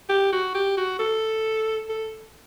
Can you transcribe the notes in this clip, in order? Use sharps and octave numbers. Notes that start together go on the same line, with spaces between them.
G4
F#4
G4
F#4
A4
A4